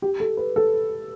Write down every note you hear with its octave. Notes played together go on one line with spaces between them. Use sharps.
G4
A4
B4
A4